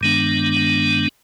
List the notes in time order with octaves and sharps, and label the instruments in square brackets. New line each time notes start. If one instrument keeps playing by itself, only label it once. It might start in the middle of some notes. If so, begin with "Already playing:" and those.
[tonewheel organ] G2 D#3 G#3 B3 D4